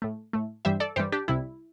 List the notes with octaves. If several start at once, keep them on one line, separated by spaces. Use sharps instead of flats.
A2 A3
A2 A3
G2 E3 G3 C5 E5
A4 D5
G2 E3 G3 G4 C5
D4 G4
C2 C3 G3 E4